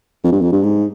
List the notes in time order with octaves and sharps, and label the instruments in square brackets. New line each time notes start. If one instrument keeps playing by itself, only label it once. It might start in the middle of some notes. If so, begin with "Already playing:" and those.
[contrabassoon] F2
G2
F2
G2
G#2